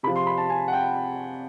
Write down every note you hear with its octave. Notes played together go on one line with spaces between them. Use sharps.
C3 F3 B5
C6
B5
A5
G#5
F#5
G5